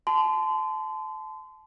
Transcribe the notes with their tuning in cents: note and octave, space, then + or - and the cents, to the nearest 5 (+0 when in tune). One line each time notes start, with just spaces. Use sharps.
A5 -25 C6 -30